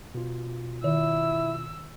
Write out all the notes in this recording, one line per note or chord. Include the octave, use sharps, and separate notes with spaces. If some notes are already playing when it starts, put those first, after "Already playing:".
B2 F4
D#3 E4 E6